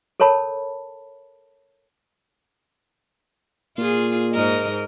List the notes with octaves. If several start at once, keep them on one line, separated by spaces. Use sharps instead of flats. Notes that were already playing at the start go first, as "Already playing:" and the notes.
A4 A#4 C#5 A5 B5
A#2 F4 G#4
G#2 A#4 D#5